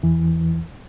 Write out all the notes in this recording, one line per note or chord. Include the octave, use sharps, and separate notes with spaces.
E2 E3